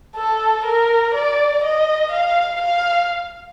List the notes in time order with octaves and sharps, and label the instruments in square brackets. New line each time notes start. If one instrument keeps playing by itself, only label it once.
[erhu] A4
A#4
D5
D#5
F5
F5